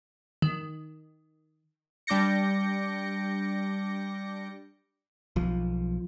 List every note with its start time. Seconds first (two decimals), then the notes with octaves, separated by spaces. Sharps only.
0.42 D#3
2.07 G3 D4 D6 G6 A#6 C#7
5.36 B1 F3